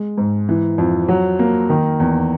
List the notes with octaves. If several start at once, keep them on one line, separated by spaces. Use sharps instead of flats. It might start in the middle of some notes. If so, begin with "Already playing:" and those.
Already playing: G#3
G#2
E3
F2
F#3
A#3
D#3
E2